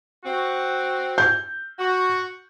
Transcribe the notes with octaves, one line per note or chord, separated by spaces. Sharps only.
C4 F#4
G6
F#4